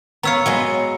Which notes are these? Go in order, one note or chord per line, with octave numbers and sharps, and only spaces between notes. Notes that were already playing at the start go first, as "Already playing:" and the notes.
B3 C#5 F5 A#5 E6 C#7
F#3 G#3 B3